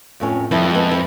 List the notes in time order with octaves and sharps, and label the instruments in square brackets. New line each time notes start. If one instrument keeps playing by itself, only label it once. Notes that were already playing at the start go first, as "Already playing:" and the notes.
[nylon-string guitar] F2 A2 C#4
[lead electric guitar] F2 [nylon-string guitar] F3 G3 E4
[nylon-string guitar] G#3 B3
E4